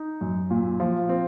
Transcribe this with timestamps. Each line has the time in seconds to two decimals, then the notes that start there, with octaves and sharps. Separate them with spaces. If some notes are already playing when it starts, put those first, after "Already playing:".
Already playing: D#4
0.21 F#2
0.51 A#2
0.80 F3
1.09 C4